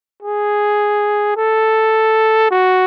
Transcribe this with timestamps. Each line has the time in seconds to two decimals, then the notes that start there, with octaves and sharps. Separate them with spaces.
0.22 G#4
1.37 A4
2.51 F#4